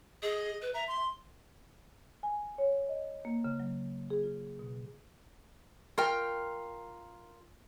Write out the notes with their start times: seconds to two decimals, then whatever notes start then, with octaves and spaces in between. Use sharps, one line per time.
0.22 G#4 D#5
0.62 B4
0.74 E5 A#5
0.88 C6
2.23 G#5
2.58 C#5
2.89 D#5
3.25 A#3
3.44 C#3
3.60 F#3
4.10 G#4
4.23 F4
4.59 B2
5.98 F4 A#4 G5